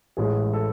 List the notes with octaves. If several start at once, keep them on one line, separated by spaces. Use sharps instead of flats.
A1 A2 G#3 G#4
A4